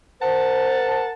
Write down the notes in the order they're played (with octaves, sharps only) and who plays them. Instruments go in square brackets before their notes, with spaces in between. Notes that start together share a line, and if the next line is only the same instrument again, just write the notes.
[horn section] A#4 F#5 A5 [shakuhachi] C5